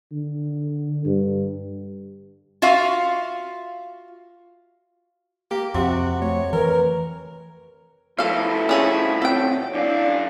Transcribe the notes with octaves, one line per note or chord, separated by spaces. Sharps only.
D3
G2
F4 F#4 E5 F5
A#3 G4
F2 C3 F#4
A3 C#5
E3 A#4 B4
B2 F3 A3 E4 A4 F5
C#4 G#4 A4
C4 A4 C#5 G5
F#2 D4 E4 D5 F5